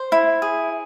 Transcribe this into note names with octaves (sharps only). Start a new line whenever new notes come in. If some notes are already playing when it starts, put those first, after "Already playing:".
Already playing: C5
E4
G#4